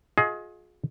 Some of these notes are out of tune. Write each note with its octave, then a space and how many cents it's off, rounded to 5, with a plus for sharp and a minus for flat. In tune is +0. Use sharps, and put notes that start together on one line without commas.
F4 +40 G#4 +20 D#5 +25